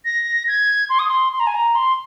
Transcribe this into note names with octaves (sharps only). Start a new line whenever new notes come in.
A#6
G#6
C6
D#6
C6
C6
A#5
G#5
A#5
C6